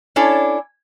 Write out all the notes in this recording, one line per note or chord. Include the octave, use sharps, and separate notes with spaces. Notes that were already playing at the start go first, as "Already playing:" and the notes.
C#4 D4 E4 A4 C#5 D5